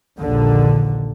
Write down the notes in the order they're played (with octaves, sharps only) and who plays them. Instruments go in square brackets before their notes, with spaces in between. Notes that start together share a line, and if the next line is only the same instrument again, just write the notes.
[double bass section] A#1 D#2 D3